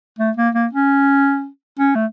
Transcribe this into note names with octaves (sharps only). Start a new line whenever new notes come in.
A3
A#3
A#3
C#4
C#4
A3